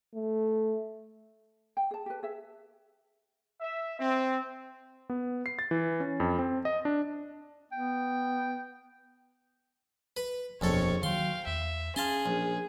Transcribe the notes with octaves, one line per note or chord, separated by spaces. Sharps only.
A3
G5
G#4 A5
G4 B4
G#4 E5
E5
C4
B3
C7
A6
E3
C#4
F2
C4
D#5
D4
B3 G5
B4
D#1 A#1 F2 B2 A4 C#5 C#6
D#3 F#3 F5 G5 C6
E2 E5
C#4 G#4 F5 A5 C6
A#1